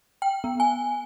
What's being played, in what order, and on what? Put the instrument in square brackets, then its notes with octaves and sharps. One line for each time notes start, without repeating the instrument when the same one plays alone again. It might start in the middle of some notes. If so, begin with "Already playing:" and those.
[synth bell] G5
B3
G#5